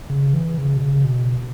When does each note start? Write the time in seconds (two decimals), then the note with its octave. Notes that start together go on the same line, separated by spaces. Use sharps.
0.10 C#3
0.34 E3
0.58 C#3
0.77 B2
0.81 C#3
1.05 B2